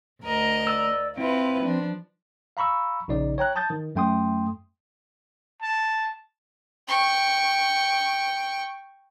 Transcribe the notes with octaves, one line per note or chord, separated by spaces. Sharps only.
D2 A#4 D#5
D5 E6
C4 E4 F4 B4
F3 D4
F5 A#5 B5 C#6 E6
A#1 C#3 D#4 D5
C#5 G5 A#5 F#6
A5 D#6 G6 A6
D#3
F#2 A3 G5 C6 D#6
A5
G5 C#6